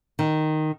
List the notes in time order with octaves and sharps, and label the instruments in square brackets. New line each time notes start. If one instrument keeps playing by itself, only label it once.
[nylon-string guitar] D#3